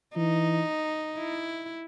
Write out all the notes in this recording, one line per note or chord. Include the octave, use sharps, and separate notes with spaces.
E3 D#4
E4